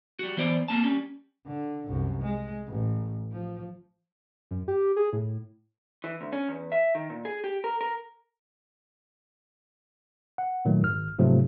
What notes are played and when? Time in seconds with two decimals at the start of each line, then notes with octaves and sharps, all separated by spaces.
0.19 G3 F#4
0.37 E3 B3 C5 D5
0.68 A#3 C4 A5
0.84 G3 C#4
1.47 D3
1.87 C2 F#2
2.22 G#3
2.68 A1
3.32 F3
4.51 F#2
4.68 G4
4.96 G#4
5.13 A2
6.04 E3
6.21 D2
6.33 C#4
6.48 E2
6.72 E5
6.95 D#3
7.10 A#2
7.25 G#4
7.44 G4
7.64 A#4
7.81 A#4
10.38 F#5
10.65 A#2 D#3 F#3 A3
10.83 G#1 F6
11.19 G#2 C3 F3 F#3 A3